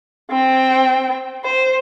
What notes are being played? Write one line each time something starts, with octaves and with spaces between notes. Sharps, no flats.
C4 G5
C5